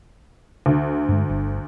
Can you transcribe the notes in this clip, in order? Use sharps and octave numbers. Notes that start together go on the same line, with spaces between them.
D2
G2 G#3
G1